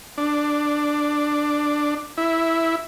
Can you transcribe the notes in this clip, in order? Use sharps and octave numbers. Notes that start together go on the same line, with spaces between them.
D4
E4